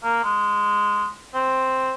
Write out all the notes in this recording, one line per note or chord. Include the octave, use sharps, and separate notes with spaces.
A#3
G#3
C4